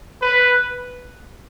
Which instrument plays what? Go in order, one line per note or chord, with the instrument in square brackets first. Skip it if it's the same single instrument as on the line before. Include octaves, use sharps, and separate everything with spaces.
[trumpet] B4